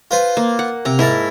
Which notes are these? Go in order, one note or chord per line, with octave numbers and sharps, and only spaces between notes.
F4 B4 C5
A#3
F#5
C3 A#5
G#2 E4 A#4 A5